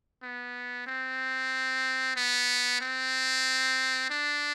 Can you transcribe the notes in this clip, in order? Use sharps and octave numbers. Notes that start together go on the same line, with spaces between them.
B3
C4
B3
C4
D4